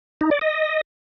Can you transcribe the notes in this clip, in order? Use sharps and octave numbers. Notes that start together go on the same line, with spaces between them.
D#4
D5
D#5